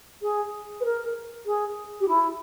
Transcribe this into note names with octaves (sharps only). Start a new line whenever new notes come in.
G#4
B4
A#4
G#4
G4
E4